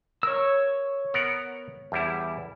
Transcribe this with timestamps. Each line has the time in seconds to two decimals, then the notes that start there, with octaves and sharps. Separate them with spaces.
0.23 A#4 C#5 E6
1.14 B3 A#4 F#5
1.92 E2 G3 E4